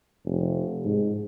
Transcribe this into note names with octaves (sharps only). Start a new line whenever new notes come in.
F1
G#2